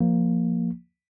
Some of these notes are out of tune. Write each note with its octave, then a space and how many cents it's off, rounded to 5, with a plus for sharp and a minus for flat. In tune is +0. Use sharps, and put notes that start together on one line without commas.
F3 +0 A#3 +0